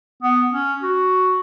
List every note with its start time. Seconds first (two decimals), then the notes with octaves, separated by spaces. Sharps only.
0.23 B3
0.53 C#4
0.82 F#4